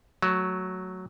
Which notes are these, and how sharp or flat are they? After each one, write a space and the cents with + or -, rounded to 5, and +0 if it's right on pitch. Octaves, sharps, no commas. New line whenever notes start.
F#3 +0 A3 +0